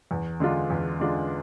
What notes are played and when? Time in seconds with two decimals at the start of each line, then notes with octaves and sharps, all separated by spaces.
0.11 E2
0.40 D3 G#3 D4 F4
0.70 E2
1.00 D3 G#3 D4 F4